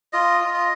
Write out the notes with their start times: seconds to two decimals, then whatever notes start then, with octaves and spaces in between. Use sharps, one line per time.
0.13 F4 D#5
0.41 F4
0.54 D#5